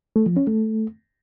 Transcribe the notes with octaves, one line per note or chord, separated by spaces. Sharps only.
A3
F3
C#4
A3